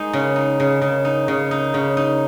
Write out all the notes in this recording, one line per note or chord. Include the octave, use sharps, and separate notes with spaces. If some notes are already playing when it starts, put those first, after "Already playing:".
Already playing: G#3 D#4
C#3
D#4
C#3
C#3
D#4
C#3
D#4
C#3
D#4